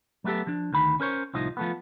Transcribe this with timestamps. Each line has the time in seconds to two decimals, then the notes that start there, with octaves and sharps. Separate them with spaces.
0.24 F#3 A3 B3 G4 A4
0.47 F3 D4
0.73 D2 D#3 B5
1.00 C#4 A#4 C5 C#5
1.34 C2 A2 F3 D#4 D#5
1.57 F3 A3 B3